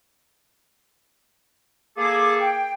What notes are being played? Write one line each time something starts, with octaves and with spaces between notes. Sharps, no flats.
A#3 G#4 A4 D6
G5